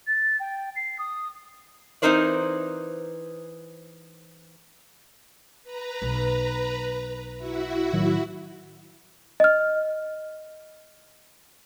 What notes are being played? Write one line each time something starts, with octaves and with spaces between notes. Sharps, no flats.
A6
G5
C7
D#6
E3 C4 D#4 A#4 C5 D5
B4 A#5
B1
E4 F#4 E5
A2 D#3 F#3
D#5 F6